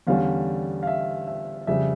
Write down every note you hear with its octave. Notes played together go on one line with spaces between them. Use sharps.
E2 D3 G3 C#4 F5
F5
E5
E5
F2 C#3 G3 E5